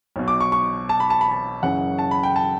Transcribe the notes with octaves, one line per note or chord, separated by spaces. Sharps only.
B1 B2
D6
C#6
C#6
A5
B5
A5
B5
A5
F#1 F#2 C#3 E3 F#5
A5
B5
G5
A5